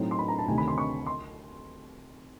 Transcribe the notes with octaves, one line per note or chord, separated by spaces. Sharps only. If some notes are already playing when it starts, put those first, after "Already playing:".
Already playing: A2 F#3 A3 C4 D#4
C6
B5
A#5
A5
D2 C3 D#3 G#5
B5
C6
C#6
C6